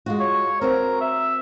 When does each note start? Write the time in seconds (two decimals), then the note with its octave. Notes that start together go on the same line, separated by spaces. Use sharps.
0.06 G#3 F4 F#4
0.20 C#5
0.61 C4 F#4 A#4 D5
1.01 E5